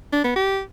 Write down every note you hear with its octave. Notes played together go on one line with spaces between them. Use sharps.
D4
B3
G4